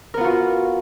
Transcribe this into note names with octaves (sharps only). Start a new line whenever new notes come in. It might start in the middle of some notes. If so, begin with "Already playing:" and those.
B3 F4 F#4 A#4